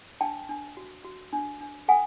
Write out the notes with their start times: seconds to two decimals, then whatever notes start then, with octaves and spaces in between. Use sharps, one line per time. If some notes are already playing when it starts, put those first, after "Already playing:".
0.21 D4 G5 A5
0.49 D4
0.77 F#4
1.04 F#4
1.33 D4
1.60 D4
1.88 A4 F#5 G#5